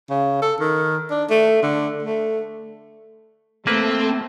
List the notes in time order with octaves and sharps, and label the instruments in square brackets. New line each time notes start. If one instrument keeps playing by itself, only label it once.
[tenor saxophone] C#3
A4
D#3
D4
A3
D3
A3
[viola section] A3 [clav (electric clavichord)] A#3 B4 [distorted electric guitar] C4